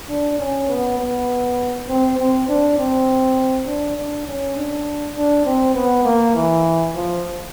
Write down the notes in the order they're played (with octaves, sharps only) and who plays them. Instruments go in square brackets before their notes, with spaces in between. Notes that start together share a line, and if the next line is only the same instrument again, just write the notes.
[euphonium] D4
C#4
B3
B3
C4
C4
D4
C4
D4
D4
C#4
D4
D4
C4
B3
A#3
E3
F3